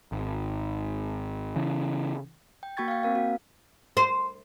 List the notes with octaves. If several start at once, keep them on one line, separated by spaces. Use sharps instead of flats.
G#1
C#3 E3
G5
A#3 F#4 G5 C#6 G#6 A6
F5 G5
A#3 C4 A#4 F5
F#4
C5